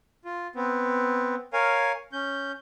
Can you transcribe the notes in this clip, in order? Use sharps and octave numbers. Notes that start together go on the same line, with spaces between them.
F4
B3 C4
A#4 C#5 F5 G#5
C#4 G6